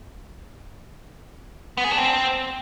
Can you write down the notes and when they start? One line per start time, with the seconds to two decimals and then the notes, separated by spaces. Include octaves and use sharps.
1.77 B3
1.84 G#4
1.91 D4
1.98 C4